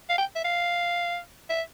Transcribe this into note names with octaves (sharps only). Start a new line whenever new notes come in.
F5
G5
E5
F5
E5